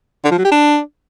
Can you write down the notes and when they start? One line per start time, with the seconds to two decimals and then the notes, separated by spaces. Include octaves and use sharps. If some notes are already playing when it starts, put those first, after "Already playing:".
0.25 D3
0.31 F3
0.38 F#3
0.45 G4
0.51 D4